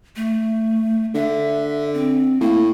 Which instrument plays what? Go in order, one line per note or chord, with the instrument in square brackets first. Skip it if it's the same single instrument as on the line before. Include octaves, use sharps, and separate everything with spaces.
[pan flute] A3
[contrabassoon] D3 [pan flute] E5
[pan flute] C4
[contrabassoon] A2 [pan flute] A#3